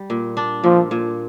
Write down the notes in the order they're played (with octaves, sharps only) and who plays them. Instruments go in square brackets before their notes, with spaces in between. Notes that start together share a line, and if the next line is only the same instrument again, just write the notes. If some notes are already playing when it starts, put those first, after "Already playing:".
Already playing: [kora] G3
A#2
D4
[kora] A#2 [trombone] F3
[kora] A#2